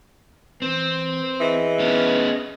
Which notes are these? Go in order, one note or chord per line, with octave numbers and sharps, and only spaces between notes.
E3 C4
E3 G#4 D#5
B3 C#4